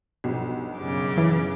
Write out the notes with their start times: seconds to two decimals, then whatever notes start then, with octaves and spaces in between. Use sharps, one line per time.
0.24 B1 G2 F3
0.79 F#2 C#3 D6
1.18 E3